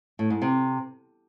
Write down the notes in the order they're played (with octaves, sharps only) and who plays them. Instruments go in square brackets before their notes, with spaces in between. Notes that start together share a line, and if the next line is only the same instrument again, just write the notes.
[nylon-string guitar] A2
G#2
C3